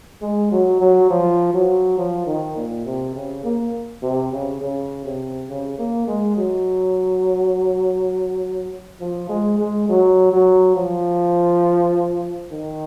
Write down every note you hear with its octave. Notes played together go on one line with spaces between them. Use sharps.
G#3
F#3
F#3
F3
F#3
F3
D#3
A#2
C3
C#3
A#3
C3
C#3
C#3
C3
C#3
A#3
G#3
F#3
F3
G#3
G#3
F#3
F#3
F3
D#3